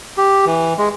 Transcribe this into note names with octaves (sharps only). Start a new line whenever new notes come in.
G4
E3
G#3